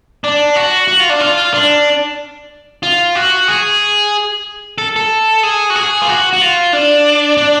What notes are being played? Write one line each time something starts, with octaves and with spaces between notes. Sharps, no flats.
D4
F#4
F#4
F4
D4
F4
D4
F4
F#4
G#4
A4
A4
G#4
F#4
G#4
F4
F#4
F#4
F4
D4
D4